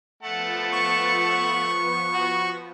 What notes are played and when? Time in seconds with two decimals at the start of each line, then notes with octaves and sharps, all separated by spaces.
0.23 F3 A3 B3 F#5 A5
0.73 C#6
2.14 F#4